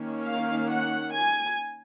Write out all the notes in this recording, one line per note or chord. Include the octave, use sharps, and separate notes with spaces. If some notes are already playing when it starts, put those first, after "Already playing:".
Already playing: D#3 A#3 C#4
F5
F#5
G#5